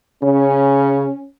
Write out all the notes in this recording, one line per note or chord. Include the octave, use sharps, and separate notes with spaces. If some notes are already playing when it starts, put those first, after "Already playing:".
C#3 C#4